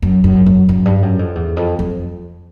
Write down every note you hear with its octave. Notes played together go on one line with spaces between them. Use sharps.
F#2
F#2
F#2
F#2
G2
F#2
F2
E2
F2
F2